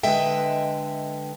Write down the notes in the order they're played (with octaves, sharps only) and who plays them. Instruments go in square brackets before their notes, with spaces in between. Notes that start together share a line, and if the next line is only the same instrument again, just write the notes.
[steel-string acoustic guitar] D3 G#3 B4 D#5 E5 G5